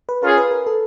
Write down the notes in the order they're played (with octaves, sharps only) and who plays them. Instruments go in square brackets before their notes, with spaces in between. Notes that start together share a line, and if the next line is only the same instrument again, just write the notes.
[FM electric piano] B4
[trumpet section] C#4 F4 G#4 [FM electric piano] A#4
[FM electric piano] B4
A#4
A4